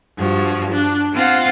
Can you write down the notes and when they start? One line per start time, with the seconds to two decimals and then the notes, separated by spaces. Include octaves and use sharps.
0.18 G2 F3 F#4
0.73 D4 F#6
1.15 C4 F4 C5 F5 F#5